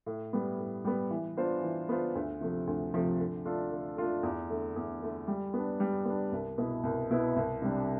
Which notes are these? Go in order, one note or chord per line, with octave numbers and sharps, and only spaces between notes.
A2
G3 B3
A2
G3 B3
E3
B3 D4 F4 C5
E3
B3 D4 F4 C5
D2
C3 F3 A3
D2
C3 F3 A3
D3
A3 D4 F4 A4
D3
A3 D4 F4 A4
E2
D3 A3
E2
D3 A3
G3
B3 D4
G3
B3 D4
C2
B2 B3 E4 B4
C2
B2 B3 E4 B4
C2
C3 G3 D4